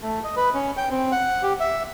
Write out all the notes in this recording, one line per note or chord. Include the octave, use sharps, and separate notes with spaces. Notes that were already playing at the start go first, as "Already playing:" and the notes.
A3
D#5
B4
C#4
G5
C4
F#5
G4
E5